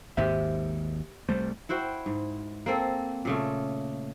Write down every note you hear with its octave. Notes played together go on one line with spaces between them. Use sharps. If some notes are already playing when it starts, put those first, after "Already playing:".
G#1 D#2 G#2 G4 C5 E5
C2 G3 A3 C5
E4 F#4 C5 G5
G#2
A#3 C4 A4
A#2 C#3 A3